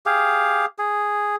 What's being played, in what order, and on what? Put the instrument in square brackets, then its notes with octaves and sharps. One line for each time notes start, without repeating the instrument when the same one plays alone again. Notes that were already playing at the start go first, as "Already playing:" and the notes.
[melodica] G4 G#4 F5
G#4